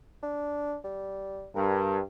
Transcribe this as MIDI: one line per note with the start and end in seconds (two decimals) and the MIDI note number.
0.23 0.77 62
0.84 1.49 55
1.56 1.98 43
1.56 1.99 70